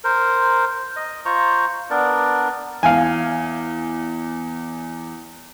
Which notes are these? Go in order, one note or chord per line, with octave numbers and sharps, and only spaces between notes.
A#4 C5
D#5
F4 C5 A#5 C#6
B3 D4 A#4 D5
E2 F5 G#5